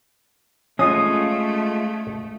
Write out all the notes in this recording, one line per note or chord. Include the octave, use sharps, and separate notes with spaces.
G#3 A3 C#4 F4 C#5 D#6